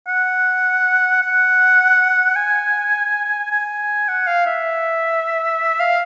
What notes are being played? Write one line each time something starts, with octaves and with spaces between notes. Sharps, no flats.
F#5
F#5
G#5
G#5
F#5
F5
E5
F5